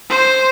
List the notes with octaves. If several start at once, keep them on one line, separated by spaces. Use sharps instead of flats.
C5